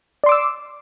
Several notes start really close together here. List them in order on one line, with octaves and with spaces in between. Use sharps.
D5 C6 D6 E6